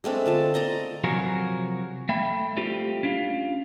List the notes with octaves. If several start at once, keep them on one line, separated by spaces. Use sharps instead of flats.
G#3 A3 C4 D4
D3 F4 A5
D5 D#5 A#5 C6
C3 F3 F#3 F#4 G#4 A#4
A3 E5 G5 B5
G3 A3 C4 F4 G4
C#4 D4 F4